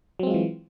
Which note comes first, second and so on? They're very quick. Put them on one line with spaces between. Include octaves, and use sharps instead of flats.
F#3 C4 G#3 F4 E3